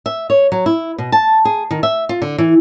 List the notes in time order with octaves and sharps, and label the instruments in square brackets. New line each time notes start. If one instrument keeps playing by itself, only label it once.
[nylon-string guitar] E5
C#5
F#3
E4
B2
A5
G#4
D#3
E5
F4
D3
E3